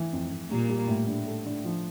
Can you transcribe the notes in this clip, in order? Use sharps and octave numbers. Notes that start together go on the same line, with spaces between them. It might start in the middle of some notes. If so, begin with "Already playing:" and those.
Already playing: E3
F2
F2
A#2 G3 A#3
G3
A2
D3
A3
D3
F3